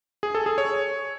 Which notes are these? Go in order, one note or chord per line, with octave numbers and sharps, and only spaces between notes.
G#4
A4
G#4
C#5